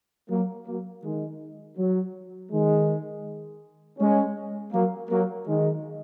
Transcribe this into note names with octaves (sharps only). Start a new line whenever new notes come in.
F#3 A#3
F#3 A#3
D#3 G#3
F#3
D#3 G#3
G#3 C#4
F#3 A#3
F#3 A#3
D#3 G#3